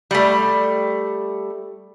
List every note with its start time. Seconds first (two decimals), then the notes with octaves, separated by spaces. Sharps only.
0.11 G3 A3